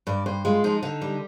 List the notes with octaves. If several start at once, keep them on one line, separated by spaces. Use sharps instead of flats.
G2 D5
G2 C5
G#3 F4
F3 D#4
D3 D#4
G3